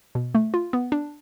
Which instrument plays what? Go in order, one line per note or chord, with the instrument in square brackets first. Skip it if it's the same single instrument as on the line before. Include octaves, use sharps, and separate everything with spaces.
[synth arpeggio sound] B2
A3
F4
B3
D4